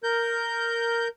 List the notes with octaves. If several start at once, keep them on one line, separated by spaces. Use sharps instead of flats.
A#4 G6